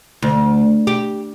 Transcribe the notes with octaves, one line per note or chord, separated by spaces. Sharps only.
D2
G4